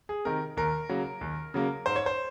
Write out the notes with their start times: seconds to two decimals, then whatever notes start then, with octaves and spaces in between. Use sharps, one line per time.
0.09 G#4
0.25 C3 D#3 A#4
0.57 D#2 A#4
0.89 C#3 F#3 A#3
1.21 D#2
1.54 C#3 F#3 A#3
1.86 G#2 C5
1.96 C#5
2.06 C5